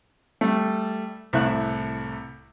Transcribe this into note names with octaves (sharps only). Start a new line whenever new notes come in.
G3 A3
C2 A2 A3 E5 F#6